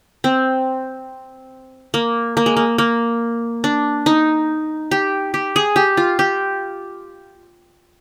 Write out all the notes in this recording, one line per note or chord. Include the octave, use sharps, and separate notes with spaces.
C4
A#3
A#3
G#3
A#3
A#3
D4
D#4
G4
G4
G#4
G4
F4
G4